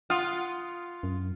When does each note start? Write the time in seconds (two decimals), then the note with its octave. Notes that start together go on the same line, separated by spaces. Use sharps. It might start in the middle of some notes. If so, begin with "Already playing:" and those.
0.10 F4 F#5 D#6 F6
1.03 F#2